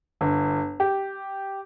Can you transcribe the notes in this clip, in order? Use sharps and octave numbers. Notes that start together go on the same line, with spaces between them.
G1
G4